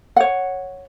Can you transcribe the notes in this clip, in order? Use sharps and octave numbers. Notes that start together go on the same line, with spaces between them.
C#5 F#5